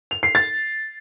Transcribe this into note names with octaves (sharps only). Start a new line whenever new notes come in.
F7
C7
A6